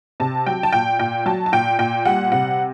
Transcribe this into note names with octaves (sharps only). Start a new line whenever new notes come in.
C3 A5
F#3 G5
A5
A#2 G5
A#2 G5
F#3 A5
A5
A#2 G5
A#2 G5
G3 F#5
C3 F#5